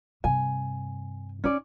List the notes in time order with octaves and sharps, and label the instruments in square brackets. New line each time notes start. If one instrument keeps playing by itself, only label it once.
[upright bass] G2 C3 [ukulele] G#5
[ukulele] C#4 D5 [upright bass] D#4